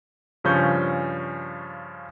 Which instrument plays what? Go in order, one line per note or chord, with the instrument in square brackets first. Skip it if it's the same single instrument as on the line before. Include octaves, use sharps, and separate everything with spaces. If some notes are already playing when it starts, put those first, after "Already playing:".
[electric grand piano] G2 C#3 F3 C#4 C#6 G6